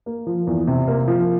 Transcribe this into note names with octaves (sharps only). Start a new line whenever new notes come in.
A#3
F3
E2
C3
A#3
F3